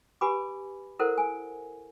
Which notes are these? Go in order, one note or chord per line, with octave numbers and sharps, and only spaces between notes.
G4 B4 G#5 B5 D6
E4 A4 A#4 C5 F#5
G#5